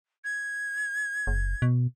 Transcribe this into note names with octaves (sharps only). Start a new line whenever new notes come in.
G#6
F#1
B2